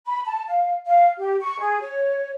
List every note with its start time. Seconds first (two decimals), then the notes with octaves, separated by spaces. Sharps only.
0.07 B5
0.26 A5
0.48 F5
0.87 F5
1.18 G4
1.41 C#6
1.60 G#4
1.81 C#5